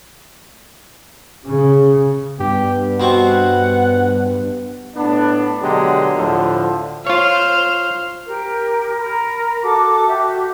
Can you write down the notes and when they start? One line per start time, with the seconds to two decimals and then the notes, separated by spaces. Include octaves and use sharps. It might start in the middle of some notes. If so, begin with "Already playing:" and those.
1.46 C#3
2.39 G2 B3 G4
3.00 B2 C4 F#5 C#6
4.95 A2 B3 D4
5.61 B2 D3 F#3 G#3 G4
6.16 D2 A2 D3 F3
7.07 F4 C5 C#5 F5
8.27 G4 A#4
8.99 A#4 A#5 B5
9.62 F#4 A4 D6
10.08 F#4 G4 E5